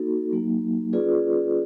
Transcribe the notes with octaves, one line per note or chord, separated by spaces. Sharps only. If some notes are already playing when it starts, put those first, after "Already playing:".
Already playing: A#3 D#4 F#4 A4
F#3 A#3 D#4
C#4 F4 G#4 B4 D5